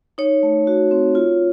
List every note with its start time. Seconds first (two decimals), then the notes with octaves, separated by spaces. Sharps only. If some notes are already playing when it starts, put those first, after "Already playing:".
0.18 D#4 C#5
0.43 A3
0.67 F#4
0.91 C4
1.15 F4